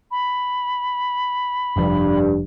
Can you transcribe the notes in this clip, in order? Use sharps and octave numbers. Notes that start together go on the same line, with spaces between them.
B5
F1 G2 F3